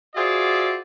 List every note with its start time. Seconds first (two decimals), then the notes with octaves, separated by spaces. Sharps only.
0.15 F4 F#4 G#4 C5 D5 E5